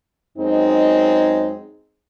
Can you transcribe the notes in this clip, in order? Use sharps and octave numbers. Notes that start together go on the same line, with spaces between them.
F#2 G#3 C4 D#4